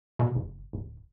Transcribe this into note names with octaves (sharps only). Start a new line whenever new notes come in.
B2
F#1
D1